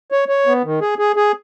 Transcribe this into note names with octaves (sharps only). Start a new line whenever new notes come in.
C#5
C#5
B3
D#3
G#4
G#4
G#4